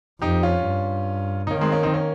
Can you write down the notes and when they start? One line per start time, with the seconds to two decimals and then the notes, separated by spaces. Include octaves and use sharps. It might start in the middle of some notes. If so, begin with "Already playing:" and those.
0.21 F2 D#4 G4
0.43 C#4 F4
0.65 G2
1.47 D#4
1.51 D#3 A#3 C#4
1.61 G#3 C4
1.72 A#3 C#4
1.83 C4 D#4
1.94 A#3 C#4